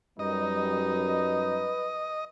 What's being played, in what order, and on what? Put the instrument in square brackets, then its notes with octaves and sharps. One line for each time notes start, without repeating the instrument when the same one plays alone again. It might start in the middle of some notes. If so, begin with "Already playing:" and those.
[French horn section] F#2 G3 [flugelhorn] D#4 [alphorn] B4 [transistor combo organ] D#5